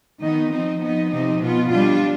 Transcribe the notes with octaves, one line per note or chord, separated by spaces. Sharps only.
D#3 B3 D#4
F3 C4 D#4
F3 B3 D#4
C3 F3 C4 D#4
B2 B3 F4
G3 D4 F4